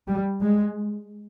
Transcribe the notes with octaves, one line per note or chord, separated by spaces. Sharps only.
G3
G#3